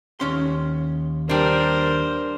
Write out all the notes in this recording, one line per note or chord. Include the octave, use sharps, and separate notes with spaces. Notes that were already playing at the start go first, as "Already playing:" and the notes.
D#2 C#4 C6
G3 D4 A#4 C5